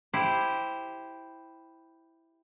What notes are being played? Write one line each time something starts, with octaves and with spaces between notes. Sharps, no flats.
E4 G4 C5